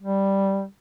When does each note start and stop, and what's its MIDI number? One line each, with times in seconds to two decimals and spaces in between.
0.02 0.64 55